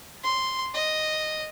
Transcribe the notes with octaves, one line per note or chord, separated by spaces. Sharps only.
C6
D#5